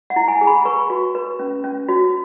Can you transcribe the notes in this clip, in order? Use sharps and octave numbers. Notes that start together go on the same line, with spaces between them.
F#5
E4
G#5
G#4
B5
B4 C#6
F#4
B4
C#4
C#4
F#4